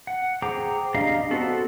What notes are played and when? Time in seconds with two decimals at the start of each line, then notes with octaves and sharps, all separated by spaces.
0.07 F#5
0.42 G#4 C5 G5 A#5 D6
0.94 D4 G4 D#5 F5 A#5
1.31 B3 C4 F#4 A4